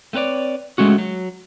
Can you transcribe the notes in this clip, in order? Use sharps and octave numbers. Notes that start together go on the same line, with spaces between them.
A3 C4 B4 C#5 D5
G#3 A3 C#4 F#4
F#3